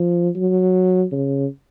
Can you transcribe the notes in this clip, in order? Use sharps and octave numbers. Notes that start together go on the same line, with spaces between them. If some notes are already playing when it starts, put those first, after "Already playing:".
Already playing: F3
F#3
C#3